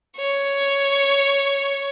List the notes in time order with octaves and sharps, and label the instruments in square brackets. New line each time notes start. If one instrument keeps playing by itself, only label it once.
[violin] C#5